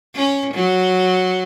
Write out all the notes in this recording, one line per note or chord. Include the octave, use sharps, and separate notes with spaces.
C#4
F#3